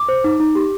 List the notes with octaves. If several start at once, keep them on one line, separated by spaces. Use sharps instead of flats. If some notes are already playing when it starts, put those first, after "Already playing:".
Already playing: D6
C5
D#4
D#4
G4